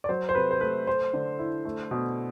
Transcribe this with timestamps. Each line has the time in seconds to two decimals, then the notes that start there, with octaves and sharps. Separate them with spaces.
0.04 D5
0.09 F#3 C5
0.29 C5
0.35 C3 B4
0.51 C5
0.61 A3 B4
0.87 A3 C5
1.14 D3
1.39 E4
1.65 A3
1.91 B2